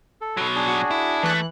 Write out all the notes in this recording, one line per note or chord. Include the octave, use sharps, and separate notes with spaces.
A4
B2 F#3
D4 G#4
F#4
E4
E3 A3 F#6